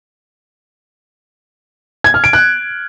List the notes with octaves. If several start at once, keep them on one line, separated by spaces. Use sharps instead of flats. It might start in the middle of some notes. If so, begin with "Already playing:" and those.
G#6
F6
D7
F#6